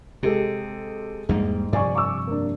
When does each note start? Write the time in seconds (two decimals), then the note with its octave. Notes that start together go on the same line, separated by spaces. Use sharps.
0.23 C3 G#3 G4 A4
1.29 E2 G#2 G3 A#3
1.73 G2 C3 F3 D5 G#5 C#6
1.95 C#6 D6 E6
2.27 A#3 D4